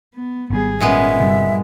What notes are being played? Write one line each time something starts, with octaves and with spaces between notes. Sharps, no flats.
B3
G#1 C#3 G3 B3 G#4
A#2 G#3 B3 C#4 E5
G1 G2 C3 G3